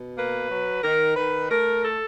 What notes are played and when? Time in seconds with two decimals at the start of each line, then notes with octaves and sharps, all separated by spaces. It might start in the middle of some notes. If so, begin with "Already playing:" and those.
Already playing: B2
0.16 A#3 B4
0.50 F#3
0.83 D#3 A#4
1.16 D#3 B4
1.49 A3 A#4
1.83 A4